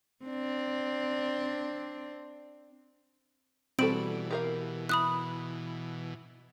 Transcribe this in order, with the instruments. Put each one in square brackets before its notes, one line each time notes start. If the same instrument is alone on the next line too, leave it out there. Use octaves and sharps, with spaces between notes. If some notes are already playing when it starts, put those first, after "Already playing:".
[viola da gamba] C4 D4
[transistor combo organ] B2 E3 [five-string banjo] G3 F#4 A4 [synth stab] C4 [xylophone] D7 F#7
[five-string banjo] G4 A#4 F5
[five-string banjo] E4 [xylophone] B5 D#6 F#6